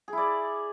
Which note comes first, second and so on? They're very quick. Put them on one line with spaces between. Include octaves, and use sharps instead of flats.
G#4 E4 D5